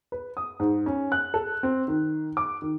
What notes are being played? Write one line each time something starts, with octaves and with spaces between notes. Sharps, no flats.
B4
D#6
G#2
C#4
F#6
A4
C4
D#3
D6
D#3